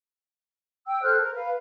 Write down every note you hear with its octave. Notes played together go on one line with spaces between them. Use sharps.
G5 E6
A4 C5 F6 F#6
A#4
B4 F5